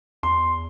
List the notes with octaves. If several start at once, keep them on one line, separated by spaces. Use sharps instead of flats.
E2 C6